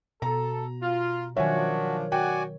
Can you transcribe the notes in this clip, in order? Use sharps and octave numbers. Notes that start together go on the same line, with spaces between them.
B2 A4 A#5
F4
D#3 F3 F#3 D4 F#4 C#5 E5 G#5
F#4 D5 G5 G#5